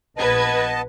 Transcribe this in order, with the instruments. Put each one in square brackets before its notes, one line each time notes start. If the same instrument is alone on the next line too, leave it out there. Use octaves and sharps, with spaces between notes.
[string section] A#1 B4 G#6 [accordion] B3 D#5 A5